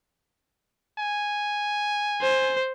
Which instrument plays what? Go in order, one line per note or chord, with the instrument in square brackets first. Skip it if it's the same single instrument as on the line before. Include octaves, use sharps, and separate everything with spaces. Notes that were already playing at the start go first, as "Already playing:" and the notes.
[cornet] G#5
[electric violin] C5